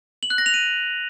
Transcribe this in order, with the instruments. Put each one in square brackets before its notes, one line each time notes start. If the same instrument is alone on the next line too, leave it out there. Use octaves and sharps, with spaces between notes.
[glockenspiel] F#7
F#6
A#6
F7
D#7